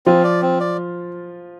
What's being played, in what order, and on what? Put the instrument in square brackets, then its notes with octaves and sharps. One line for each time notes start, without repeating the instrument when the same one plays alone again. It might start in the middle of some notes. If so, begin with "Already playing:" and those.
[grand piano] F3 F4 [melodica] C4
[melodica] D5
C4
D5